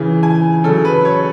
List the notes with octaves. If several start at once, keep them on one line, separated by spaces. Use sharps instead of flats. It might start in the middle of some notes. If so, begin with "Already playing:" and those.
Already playing: C#3 E3
G#5
C#3 F#3 A4
B4
C#5